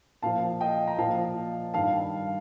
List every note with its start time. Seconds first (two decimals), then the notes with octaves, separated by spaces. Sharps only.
0.23 A#2 F3 F5 A5
0.61 D#5 G5
0.88 A#5
0.98 A#2 F3 F5 A5
1.74 G2 D#3 G3 F5 A5